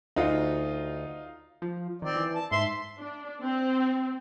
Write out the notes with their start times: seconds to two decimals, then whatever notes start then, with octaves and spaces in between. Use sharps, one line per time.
0.16 D2 D#4 F4 F#4
1.62 F3
2.02 D#3 C4 D5
2.16 E3
2.35 A5
2.51 G#2 E5 C6
2.99 D4
3.42 C4